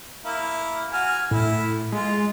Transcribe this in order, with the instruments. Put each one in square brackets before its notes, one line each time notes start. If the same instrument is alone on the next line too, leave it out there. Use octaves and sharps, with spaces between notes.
[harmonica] A#3 E4
F#4 G#5 F6
[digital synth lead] A2 [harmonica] E4
[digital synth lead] G#3 [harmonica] F4